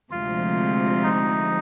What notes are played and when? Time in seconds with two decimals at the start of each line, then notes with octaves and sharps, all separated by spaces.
0.10 D2 C3 F3 G#3 F4
1.03 D#4